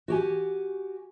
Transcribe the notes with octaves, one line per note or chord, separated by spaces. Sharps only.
F#4 G4 G#5